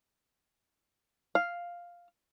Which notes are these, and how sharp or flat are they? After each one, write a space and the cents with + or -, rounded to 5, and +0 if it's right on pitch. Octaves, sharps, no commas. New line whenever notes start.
F5 +0